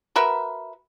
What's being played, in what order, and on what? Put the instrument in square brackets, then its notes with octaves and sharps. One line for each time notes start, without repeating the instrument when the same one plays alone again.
[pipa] F#4 A#4 B4 E5